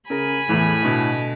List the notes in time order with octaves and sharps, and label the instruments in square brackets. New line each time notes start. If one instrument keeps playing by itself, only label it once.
[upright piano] C#3 A#4 [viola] G#5 B5
[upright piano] E2 E3 [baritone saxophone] A2
[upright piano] B2 D3 A3